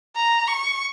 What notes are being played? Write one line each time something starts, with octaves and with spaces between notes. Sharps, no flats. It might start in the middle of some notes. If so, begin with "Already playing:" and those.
A#5
C#6